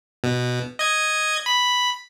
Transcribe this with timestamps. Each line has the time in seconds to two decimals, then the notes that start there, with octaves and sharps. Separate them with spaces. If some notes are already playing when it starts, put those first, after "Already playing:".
0.24 B2
0.79 D#5 G#6
1.46 B5